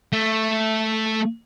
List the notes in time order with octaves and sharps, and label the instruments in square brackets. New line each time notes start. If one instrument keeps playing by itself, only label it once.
[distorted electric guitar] A3